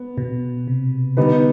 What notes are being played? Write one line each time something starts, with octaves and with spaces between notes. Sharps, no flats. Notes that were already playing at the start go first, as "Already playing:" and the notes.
Already playing: B3
B2
C3
D3 G3 B3 D#4 B4